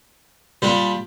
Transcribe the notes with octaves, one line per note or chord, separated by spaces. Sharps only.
A#2 G3 D4